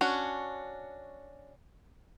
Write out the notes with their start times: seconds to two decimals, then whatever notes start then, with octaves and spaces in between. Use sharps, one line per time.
0.01 C#4 D4 F#4